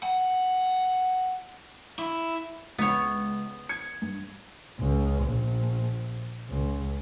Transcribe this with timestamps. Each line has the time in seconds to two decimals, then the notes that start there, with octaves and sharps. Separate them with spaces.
0.03 F#5
1.99 E4
2.79 C#2 B3 C#5
3.69 G#6 C#7
4.02 G2
4.80 C#2
5.24 A#1
6.49 C#2